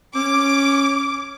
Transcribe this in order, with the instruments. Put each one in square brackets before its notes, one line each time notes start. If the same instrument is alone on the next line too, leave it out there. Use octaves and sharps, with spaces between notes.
[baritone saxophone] C#4 [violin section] D6